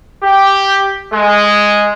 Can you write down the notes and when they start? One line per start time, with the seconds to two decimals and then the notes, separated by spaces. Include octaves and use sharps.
0.24 G4
1.14 G#3